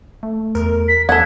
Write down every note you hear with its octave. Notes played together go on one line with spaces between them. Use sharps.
A3
E2 A#4
B6
E2 A4 F#5 G#6